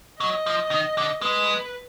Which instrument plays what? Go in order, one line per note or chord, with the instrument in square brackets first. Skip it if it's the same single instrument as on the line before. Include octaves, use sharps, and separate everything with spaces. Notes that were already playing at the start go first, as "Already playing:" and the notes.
[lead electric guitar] F#3 [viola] D#5
[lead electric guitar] F3
D#3
D3
[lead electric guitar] G#3 [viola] B4